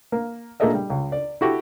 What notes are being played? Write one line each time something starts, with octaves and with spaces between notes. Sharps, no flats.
A#3
A#2 A#3 G#4 A4 D#5 E5
G3
C#2
D5
E4 F#4 G4 A4